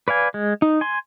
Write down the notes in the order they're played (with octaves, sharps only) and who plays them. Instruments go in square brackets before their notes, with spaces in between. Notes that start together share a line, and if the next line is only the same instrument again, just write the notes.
[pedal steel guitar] B4 D5 F5 G#5
G#3
D#4
G#5 C6